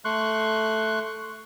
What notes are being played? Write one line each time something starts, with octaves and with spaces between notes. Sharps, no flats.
A3 C6 C#6 F#6